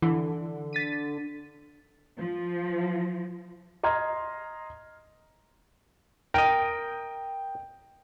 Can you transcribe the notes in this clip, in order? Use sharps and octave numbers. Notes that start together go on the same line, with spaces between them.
D3 E3
A6 B6 D#7
F3
D#5 A#5 C6 F6 G#6
A#4 D#5 G5